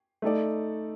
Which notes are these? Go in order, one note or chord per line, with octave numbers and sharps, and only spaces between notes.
A3 D#4 A4 D5